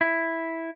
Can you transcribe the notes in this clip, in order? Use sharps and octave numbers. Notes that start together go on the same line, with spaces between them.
E4